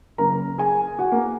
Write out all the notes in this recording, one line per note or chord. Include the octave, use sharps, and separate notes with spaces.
F#2 C#3 A#3 C#4 A#4 A#5
G#4 G#5
F#4 F#5
A#3 A#4